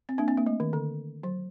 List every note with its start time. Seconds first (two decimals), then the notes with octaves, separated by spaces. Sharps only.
0.09 C4
0.18 A#3 D4
0.28 C4
0.37 A#3
0.46 A3
0.60 D#3
0.73 D3
1.23 F#3